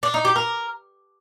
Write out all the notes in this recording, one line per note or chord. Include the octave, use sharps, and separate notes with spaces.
D4
D#4
G4
A#4